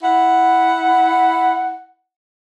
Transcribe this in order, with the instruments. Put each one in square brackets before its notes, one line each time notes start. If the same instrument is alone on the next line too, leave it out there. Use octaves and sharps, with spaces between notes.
[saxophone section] E4 F#5